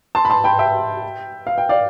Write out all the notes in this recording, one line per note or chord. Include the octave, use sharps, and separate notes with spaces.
A5 C6
B5
A5 C6
G5 B5
E5 G5
F5
G5
D5 F5